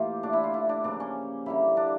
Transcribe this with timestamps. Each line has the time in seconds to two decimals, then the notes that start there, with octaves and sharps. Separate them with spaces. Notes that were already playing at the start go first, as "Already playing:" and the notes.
Already playing: A2 E3 A#3 F4 G4
0.23 D3 A3 D4
0.33 E4
0.44 F4
0.54 E4
0.69 D4
0.84 C#3 F3 A#3 D4
1.00 C#4
1.46 D3 G3 A#3 E4
1.77 D4